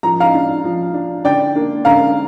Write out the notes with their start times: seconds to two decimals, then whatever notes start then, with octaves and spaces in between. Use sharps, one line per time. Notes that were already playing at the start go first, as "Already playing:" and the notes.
0.03 F3 A#5
0.20 F5 A#5
0.34 D4
0.64 F3
0.94 D4
1.25 D3 D5 G5
1.55 A#3 D4
1.85 D3 F5 A#5